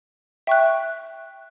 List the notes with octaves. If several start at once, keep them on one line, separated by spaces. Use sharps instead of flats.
E5 G5 C#6 F#6